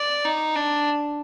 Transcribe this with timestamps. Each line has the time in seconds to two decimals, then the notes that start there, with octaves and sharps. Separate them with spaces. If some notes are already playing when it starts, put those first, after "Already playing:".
Already playing: D5
0.25 D#4
0.56 D4